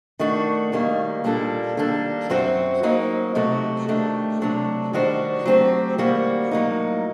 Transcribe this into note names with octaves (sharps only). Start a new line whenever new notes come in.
D#3 A3 D4 F#4
D#2 D#3 G3 A#3
A#2 G3 A#3 D4 A4
D#3 G3 A#3 D4 A4
F#2 F#3 C4 F#4 C5
F#3 A#3 D#4
C3 F#3 A3 D#4 F#4
D#3 A3 D4 G4
C3 F#3 A3 D4
D#3 G3 D4 F#4 C5
F#3 A3 C4 G4 C5
D#3 G3 A#3 F#4
A2 F#3 A#3 D#4